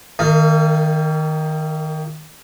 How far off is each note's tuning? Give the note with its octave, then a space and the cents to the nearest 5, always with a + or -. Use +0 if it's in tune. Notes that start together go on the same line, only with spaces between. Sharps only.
D#3 +0 A#3 -40